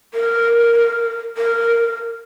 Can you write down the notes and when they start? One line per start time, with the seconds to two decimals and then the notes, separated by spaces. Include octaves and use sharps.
0.14 A#4
1.37 A#4